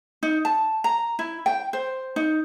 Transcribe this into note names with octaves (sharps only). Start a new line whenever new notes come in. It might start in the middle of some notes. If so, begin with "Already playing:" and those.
D#4
A5
A#5
E4
G5
C5
D#4